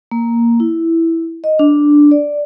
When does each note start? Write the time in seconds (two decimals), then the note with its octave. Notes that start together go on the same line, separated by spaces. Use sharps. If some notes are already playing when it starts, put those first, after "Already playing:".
0.11 A#3
0.60 E4
1.44 D#5
1.59 D4
2.11 D5